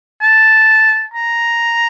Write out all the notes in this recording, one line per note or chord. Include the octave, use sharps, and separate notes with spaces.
A5
A#5